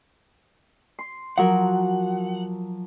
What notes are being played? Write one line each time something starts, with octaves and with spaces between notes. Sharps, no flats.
C6
F3 F#3 A#4 F#5